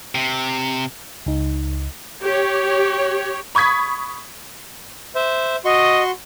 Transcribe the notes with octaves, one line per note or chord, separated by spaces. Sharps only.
C3
C#2 D#4
G4 C#5
B5 C#6 D#6 G#6 B6
C5 E5
F#4 D#5 C6 C#6